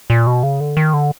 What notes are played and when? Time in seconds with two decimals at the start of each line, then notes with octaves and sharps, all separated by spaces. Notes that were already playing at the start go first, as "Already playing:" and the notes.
0.10 A#2
0.27 B2
0.43 C#3
0.60 D3
0.77 D#3
0.94 D3